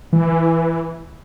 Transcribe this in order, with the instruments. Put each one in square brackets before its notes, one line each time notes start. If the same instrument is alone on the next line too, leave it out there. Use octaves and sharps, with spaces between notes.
[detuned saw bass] E3